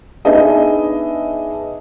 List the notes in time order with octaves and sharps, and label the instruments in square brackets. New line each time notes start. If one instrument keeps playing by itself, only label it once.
[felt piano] B3 D4 D#4 G#4 D#5 E5